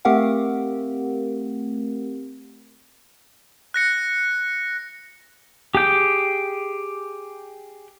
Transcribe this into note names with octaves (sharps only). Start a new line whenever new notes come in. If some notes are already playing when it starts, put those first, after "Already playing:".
A3 C4 G4 A#4 F5 F#5
F#6 A#6 C#7
G4 G#4 G5